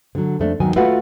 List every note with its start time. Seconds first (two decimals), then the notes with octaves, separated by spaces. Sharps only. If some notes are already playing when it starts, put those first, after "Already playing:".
0.15 D3 F#3
0.39 F2 A3 D4
0.60 E2 D#3 F#3 G#5
0.76 A3 F4 F#4 B4 F5 F#5